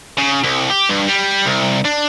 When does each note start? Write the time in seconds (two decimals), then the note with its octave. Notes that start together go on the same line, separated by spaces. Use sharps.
0.19 C#3
0.44 C2
0.70 G4
0.89 G2
1.07 G3
1.46 C2
1.85 D4